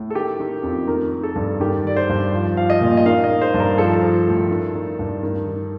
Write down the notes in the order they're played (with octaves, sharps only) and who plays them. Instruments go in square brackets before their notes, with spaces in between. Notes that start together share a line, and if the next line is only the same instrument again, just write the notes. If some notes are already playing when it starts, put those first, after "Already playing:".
Already playing: [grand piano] A2
A4
D#3 G4
D#3
F2
D#3 A#4
D#3
A4
G2
D#3 G4
D#3 D5
C5
G2
F3
F3 F5
D#5
A#2
D#5
D#3 F5
D#5
D#3
C5
G2
A#4
F3 A4
F3
A2
D#3
D#3
G2
D#3
D#3